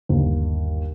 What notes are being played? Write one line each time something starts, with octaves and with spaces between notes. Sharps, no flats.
G1 D#2